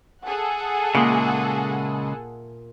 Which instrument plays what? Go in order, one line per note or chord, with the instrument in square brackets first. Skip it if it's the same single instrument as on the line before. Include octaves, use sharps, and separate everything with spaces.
[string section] G#4 A4 F#5
[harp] A#2 E5 D6 [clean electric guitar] C#3 G#3